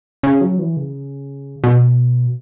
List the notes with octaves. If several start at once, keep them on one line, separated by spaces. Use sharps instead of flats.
C#3
F#3
E3
C#3
B2